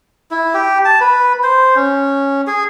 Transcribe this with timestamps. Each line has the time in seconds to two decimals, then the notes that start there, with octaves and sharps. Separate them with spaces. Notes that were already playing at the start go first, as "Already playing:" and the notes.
0.31 E4
0.54 G4
0.85 A5
1.01 B4
1.43 C5
1.76 C#4
2.47 G#4